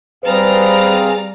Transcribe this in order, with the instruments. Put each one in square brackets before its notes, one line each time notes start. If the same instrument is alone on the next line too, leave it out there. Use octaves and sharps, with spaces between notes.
[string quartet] G3 A#5 A6 [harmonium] C4 G#4 F5 [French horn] B4